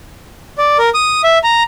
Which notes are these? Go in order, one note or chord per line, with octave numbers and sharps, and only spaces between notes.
D5
A#4
D#6
E5
A#5